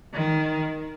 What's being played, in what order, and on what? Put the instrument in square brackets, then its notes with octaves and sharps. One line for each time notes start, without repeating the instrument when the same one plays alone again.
[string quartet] D#3